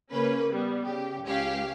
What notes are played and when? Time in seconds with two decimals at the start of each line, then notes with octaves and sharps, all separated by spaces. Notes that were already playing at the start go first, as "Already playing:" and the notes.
0.11 C#3 A#3 C#4 B4
0.51 G3 B3
0.82 C#3 G4
1.24 C#2 C#4 G4 F5